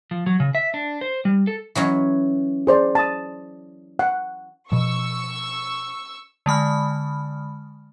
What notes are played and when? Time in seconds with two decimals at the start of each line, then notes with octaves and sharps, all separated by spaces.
0.11 F3
0.26 F#3
0.40 C#3
0.55 E5
0.74 D4
1.01 C5
1.25 G3
1.47 A4
1.75 E3 F#3 C#4
2.67 G#4 C5 D5
2.95 A5 D#6
3.99 F#5
4.72 B2 F3 C#6 E6
6.46 D3 G#3 B5 F6